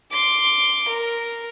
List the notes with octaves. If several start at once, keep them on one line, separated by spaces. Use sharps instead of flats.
C6 D6
A#4